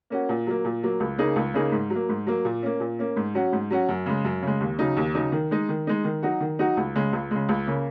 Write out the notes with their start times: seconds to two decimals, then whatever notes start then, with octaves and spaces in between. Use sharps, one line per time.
0.10 A#3 C#4 F#4
0.29 A#2
0.47 F#3 A#3
0.65 A#2
0.83 F#3 A#3
1.00 C#2
1.18 C#3 A#3 D#4 G#4
1.36 C#2
1.54 C#3 A#3 D#4 G#4
1.72 G#2
1.90 F#3
1.95 A#3
2.09 G#2
2.27 F#3 A#3
2.45 A#2
2.63 A#3 C#4
2.80 A#2
2.99 A#3 C#4
3.16 G#2
3.35 F#3 C#4 F#4
3.53 G#2
3.70 F#3 C#4 F#4
3.89 F#2
4.06 C#3 G#3
4.25 F#2
4.42 C#3 G#3
4.60 D#2
4.79 C#3 F#3 D#4
4.97 D#2
5.15 C#3 F#3 D#4
5.32 D#3
5.51 G#3 D#4
5.69 D#3
5.87 G#3 D#4
6.04 D#3
6.23 F#3 D#4 F#4
6.41 D#3
6.59 F#3 D#4 F#4
6.77 C#2
6.95 C#3 G#3
7.13 C#2
7.31 C#3 G#3
7.49 C#2
7.67 C#3 A#3